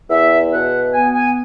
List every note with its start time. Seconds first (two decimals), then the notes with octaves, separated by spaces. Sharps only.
0.10 E2 E5
0.51 B2 F#5
0.94 B3 G#5
1.14 G#5